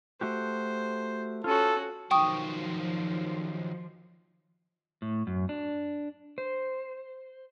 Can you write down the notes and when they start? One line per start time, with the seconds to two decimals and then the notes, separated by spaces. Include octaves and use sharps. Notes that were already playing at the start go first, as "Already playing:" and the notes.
0.21 A3 F#4 G4 C5
1.44 C#4 F4 F#4 A4
2.11 D#3 F3 F#3 G5 C#6 D#6
5.02 A2
5.27 F#2
5.49 D4
6.38 C5